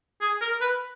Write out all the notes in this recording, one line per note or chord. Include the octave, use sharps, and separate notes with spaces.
G#4
A#4
B4